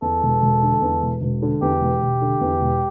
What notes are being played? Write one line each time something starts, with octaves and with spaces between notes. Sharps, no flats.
E2 A4
E1
E1
D3
E2
E1
E1
D3
E2 G4
E1
E1
D3
E2
E1